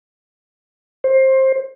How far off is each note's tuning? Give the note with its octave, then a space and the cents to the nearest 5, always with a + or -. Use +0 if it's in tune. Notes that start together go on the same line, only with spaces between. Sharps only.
C5 +20